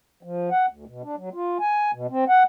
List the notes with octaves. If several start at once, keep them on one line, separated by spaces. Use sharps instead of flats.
F3
F#5
D2
B2
D4
F#3
F4
G#5
B2
C4
F#5